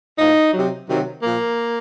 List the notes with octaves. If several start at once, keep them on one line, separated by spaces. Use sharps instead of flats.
A2 F3 D#4
C3 F#3
C3 D#3 F#3
A#2 F3 A#3